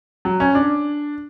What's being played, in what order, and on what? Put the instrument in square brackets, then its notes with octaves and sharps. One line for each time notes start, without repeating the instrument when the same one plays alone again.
[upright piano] F#3
C#4
D4